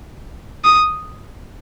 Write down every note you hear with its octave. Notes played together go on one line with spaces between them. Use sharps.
D#6